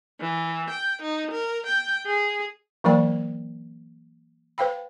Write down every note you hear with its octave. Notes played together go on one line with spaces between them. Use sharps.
E3
G5
D#4
A#4
G5
G#4
E3 F#3 A#3 D5 G5 B5
B4 C5 F5 G5 B5